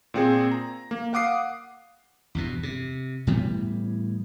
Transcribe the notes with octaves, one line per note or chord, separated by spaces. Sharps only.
A#2 C4 G#4
A#5
A#3
F5 F#5 D6 D#6 C7
E2 G2 B2
C3
A2 E3 G3 B3